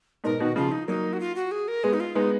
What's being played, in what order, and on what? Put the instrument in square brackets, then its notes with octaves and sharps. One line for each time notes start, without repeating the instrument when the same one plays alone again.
[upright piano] G#2 B2 [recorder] A#4
[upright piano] B2 D#3 [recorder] F#4
[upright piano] C#3 F3 [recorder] F4
[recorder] D#4
[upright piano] F#3 A#3 [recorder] D#4
[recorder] F#4
F4
F#4
G#4
A#4
[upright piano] G#3 B3 [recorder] G#4
[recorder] D#4
F4
[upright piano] G#3 B3 [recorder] D#4